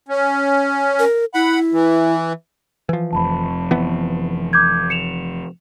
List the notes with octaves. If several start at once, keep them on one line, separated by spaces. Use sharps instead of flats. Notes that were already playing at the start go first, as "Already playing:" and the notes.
C#4
A#4
E4 F#5 B5
E3
E3 F3
F1 F2 A5 B5
E3 B3
D6 G6 G#6
C#7 E7 F7